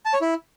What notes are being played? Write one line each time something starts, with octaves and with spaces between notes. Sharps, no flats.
A5
C#5
E4